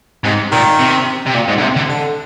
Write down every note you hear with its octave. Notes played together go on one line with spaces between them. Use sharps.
G#2 C3
A#2 D#3
C3
C3
A#2
G#2
D3
C3
D3
D3